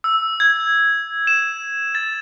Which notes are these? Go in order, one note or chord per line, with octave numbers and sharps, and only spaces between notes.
E6
G#6
E7
A6